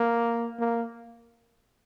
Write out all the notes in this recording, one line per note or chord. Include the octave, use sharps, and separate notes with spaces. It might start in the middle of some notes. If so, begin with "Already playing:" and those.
Already playing: A#3
A#3